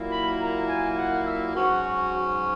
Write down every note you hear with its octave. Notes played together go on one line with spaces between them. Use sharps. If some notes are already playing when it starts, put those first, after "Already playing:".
Already playing: A#2 F#3 A#3 E4
B5
A#5
G#5
F#5
E5
G#2 F#3 C#4 F#4